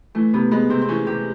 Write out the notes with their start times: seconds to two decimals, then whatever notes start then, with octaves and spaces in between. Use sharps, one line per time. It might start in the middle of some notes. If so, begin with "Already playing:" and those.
0.15 E3 A3
0.33 C3 B3
0.51 G#3 B3
0.70 C3 C4
0.82 C4
0.88 E3 C#4
1.06 C3 G4